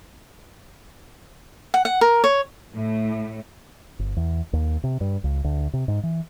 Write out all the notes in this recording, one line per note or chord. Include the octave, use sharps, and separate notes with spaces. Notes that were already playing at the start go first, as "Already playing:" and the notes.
F#5
F#5
A#4
C#5
A2
G1
E2
D#2
C3
G2
C#2
D2
C3
G#2
E3